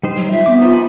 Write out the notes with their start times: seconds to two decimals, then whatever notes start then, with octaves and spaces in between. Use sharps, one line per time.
0.03 G3 D#4 C5
0.17 F#3
0.31 F4 E5
0.46 B3 C4 D6
0.61 D#4 F4 G4 C5
0.73 D#4 G#5 B5